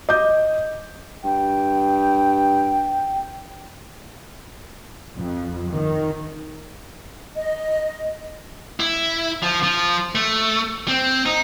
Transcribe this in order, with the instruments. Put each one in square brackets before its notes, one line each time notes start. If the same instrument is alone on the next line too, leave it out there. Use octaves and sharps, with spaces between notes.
[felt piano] D#5 D6 G6
[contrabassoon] G2 [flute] G5
[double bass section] F2
D#3
[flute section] D#5
[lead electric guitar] E4
F3
F3
A3
C4
D#4